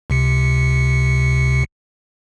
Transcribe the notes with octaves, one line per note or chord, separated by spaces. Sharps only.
C#2 C3 C#7